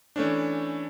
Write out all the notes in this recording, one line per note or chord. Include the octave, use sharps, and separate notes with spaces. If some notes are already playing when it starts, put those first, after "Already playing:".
E3 A3 C#4 D4